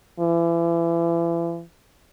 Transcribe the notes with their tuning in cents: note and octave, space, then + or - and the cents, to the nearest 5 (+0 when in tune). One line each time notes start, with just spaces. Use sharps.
E3 +35